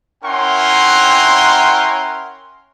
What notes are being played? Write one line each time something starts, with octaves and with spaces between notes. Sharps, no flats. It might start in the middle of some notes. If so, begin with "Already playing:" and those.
C#4 E4 A#4 F#5 G5 C6